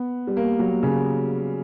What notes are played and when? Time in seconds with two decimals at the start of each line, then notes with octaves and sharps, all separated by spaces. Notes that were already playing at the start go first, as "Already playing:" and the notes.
Already playing: B3
0.27 G3
0.37 A#3
0.59 F#3
0.83 C#3